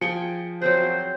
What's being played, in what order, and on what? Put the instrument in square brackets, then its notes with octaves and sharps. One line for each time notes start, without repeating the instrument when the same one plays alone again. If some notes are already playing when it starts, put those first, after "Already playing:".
[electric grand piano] F3 C#7 [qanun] G#4 G5 G#5
[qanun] F#3 C4 G#4 [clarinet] C5